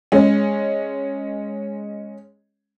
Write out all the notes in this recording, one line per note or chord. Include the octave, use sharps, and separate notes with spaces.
G#3 C#4